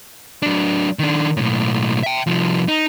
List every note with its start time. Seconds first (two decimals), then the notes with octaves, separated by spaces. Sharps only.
0.42 F#3 D4
0.99 D#3 D4
1.37 B1 A2
2.03 E5 G5
2.27 C2 F3
2.68 D#4